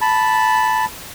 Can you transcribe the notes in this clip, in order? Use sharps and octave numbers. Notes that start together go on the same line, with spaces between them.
A5 B5